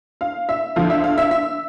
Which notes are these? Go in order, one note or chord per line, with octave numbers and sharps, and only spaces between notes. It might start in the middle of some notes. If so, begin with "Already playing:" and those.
F5
E5
D2 D3 F3 F5
E5
F5
E5
E5